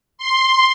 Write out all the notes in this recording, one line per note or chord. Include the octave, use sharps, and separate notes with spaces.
C6